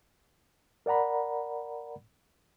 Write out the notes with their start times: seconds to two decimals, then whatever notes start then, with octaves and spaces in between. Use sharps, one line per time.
0.86 A#4 D5 F#5 A#5 B5